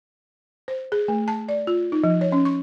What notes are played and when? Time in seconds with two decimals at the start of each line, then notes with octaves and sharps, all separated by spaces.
0.68 C5
0.92 G#4
1.08 A3
1.28 A5
1.49 D5
1.67 F4
1.92 D#4
2.04 F3
2.21 C#5
2.32 C#4
2.45 C#6